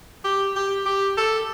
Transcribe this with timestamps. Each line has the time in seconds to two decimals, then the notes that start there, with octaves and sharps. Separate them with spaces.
0.24 G4
0.56 G4
0.86 G4
1.17 A4